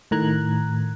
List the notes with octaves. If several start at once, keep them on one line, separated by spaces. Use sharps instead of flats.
A2 D#3 A#5 F#6 G#6